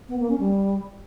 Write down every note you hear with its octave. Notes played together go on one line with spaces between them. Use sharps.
B3
A#3
C#4
G3